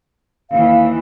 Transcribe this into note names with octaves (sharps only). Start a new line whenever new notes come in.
D#2 E3 F5